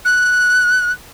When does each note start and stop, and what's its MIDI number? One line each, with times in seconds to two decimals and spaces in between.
0.05 0.92 90